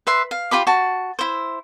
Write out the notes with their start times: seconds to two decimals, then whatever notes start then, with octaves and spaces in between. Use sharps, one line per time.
0.07 B4 E5 C6
0.31 F5
0.51 F4 G4 B5 D6
0.67 F#4 A5
1.19 E4 C5